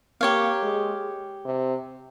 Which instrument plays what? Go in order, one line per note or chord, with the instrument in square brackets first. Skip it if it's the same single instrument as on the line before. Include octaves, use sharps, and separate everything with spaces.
[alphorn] A#3 [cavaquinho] G4 C#5 F5
[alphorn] G#3
C3